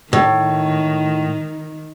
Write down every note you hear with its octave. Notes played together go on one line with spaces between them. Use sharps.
A2 D#3